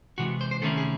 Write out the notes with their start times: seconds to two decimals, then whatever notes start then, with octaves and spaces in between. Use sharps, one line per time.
0.18 C3 E3 G#3 F#4
0.41 C5
0.51 C5
0.62 C3 D#3 A3 C#4 E4 A4
0.77 G#4